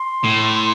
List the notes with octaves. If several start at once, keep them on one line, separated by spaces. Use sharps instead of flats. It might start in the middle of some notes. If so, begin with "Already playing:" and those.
Already playing: C6
A2